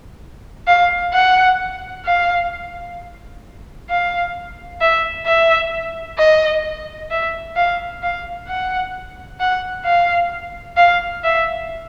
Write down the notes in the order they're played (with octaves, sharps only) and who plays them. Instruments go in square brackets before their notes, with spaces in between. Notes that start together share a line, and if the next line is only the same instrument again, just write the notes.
[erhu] F5
F#5
F5
F5
E5
E5
D#5
E5
F5
F5
F#5
F#5
F5
F5
E5